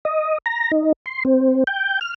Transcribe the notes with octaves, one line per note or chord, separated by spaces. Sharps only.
D#5
A#5
D#4
C6
C4
G5
F6